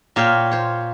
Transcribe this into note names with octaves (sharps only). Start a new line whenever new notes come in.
A#2 C#5 F5 G5
C5 C#5